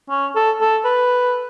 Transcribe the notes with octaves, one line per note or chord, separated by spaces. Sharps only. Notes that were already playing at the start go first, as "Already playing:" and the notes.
C#4
A4
A4
B4